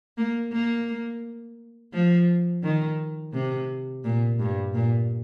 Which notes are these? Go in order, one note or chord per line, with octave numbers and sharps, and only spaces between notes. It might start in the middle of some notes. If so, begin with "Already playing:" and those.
A#3
A#3
F3
D#3
C3
A#2
G2
A#2